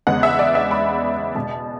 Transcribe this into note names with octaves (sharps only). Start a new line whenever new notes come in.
E2 C#3 G#3 B3 F#5
E5
D5
E5
B5
E2 B2 G#3 A5